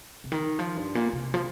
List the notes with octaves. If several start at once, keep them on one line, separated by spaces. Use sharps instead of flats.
C3
D#3
F3
G2
A#2
C3
F3